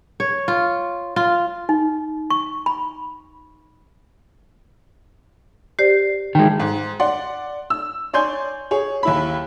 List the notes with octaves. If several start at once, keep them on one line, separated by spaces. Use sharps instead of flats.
C#5
F4
F4
D#4
C#6
B5
G4 C5 D5 C7
D#3 G#3 G5
G#2
D5 F#5 C6
E6
C#5 D5 G#5 C6 G6
G#4 C#5
D#2 E4 B5